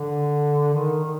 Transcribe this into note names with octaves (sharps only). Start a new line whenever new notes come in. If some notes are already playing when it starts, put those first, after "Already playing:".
Already playing: D3
D#3
D#3